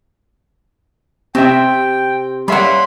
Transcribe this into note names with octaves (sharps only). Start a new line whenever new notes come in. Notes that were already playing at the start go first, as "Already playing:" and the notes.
C3 C4 E5 G5
G3 A#3 C#4 E5 F#5 B5 C6